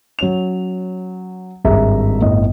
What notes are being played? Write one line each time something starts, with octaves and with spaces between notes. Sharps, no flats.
F#3 C#4 F7
G#1 G2 G#4 E5 A#5
G1 A2 D#5